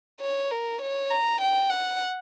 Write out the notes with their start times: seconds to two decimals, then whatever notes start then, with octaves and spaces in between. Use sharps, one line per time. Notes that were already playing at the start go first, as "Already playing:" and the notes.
0.21 C#5
0.51 A#4
0.82 C#5
1.11 A#5
1.41 G5
1.70 F#5